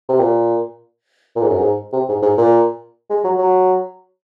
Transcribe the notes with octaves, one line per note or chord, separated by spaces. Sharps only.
C3
A#2
A#2
G#2
F#2
G#2
C3
G#2
G#2
A#2
G#3
F#3
F#3